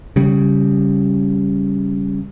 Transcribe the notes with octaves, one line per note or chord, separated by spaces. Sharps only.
C#3 G3